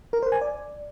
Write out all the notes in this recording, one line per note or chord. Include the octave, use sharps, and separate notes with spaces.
A#4
C5
G#5
D5